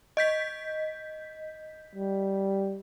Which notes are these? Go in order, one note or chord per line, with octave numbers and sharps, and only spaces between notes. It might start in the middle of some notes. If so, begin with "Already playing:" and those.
D#5 G6 B6
G3